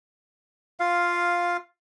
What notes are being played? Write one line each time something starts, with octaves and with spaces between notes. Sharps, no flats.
F4 F5